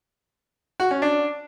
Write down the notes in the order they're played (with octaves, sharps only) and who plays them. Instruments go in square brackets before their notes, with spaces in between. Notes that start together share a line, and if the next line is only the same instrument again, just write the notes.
[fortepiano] F#4
C#4
D4